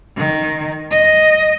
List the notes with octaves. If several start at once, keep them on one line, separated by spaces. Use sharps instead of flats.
D#3
D#5